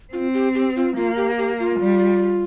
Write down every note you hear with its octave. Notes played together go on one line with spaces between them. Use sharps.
C4 F4
G4
G4
F4
A#3 F4
G4
G4
F4
G3